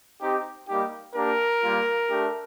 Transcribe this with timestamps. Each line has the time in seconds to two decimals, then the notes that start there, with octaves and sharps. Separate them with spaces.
0.20 C4 D#4 G4
0.68 G3 A#3 D#4 G4
1.15 A#3 D4 G4 A#4
1.63 G3 A#3 F4
2.10 A3 D4 G4